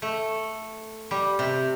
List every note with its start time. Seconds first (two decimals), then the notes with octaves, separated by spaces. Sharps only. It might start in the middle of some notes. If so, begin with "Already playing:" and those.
0.02 A3
1.11 G3
1.39 C3